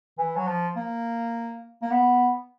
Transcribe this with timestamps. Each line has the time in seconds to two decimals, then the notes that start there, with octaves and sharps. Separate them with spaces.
0.18 E3
0.36 F#3
0.48 F3
0.76 A#3
1.82 A#3
1.91 B3